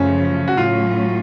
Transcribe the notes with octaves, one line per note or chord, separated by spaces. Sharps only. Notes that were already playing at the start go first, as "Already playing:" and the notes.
Already playing: F#2 C#3 F3 A3 C#4
F#4
A2 F#3 C#4 F4